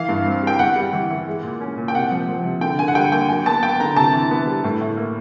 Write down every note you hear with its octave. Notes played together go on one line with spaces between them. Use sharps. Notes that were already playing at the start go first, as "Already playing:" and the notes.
Already playing: E3 F5
G2
C4
G3 G5
E2 F#5
G3
E3
E3
G#3
A#2
C#4
A#2
G5
C3 F#5
F3
F3
C3
D3 G5
D3 G#5
F#5
G3 G5
D#2 G5
F#3 G#5
B3 A5
B3 G5
D3 A#5
C3 A5
E3
B3
G3
A2
A2
A#3